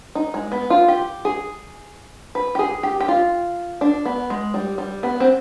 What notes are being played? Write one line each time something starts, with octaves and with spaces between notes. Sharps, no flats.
D#4
G#3
B3
F4
G4
G#4
B4
G4
G#4
G4
G4
F4
D4
B3
G#3
G3
G3
B3
C4